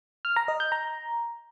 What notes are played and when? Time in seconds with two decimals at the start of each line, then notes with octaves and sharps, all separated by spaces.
0.25 F6
0.36 A#5
0.48 D#5
0.60 G6
0.72 A#5